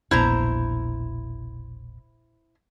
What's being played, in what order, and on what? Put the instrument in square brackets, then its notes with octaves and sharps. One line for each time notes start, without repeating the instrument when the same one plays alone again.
[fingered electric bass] E1 A#1 B3 [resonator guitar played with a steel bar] E4 C5 A#5